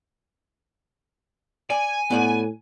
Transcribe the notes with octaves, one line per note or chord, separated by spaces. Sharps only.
D5 G#5
A2 B3 D5 F#5